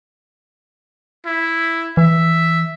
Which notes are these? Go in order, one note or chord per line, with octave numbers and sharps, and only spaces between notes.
E4
E3 E5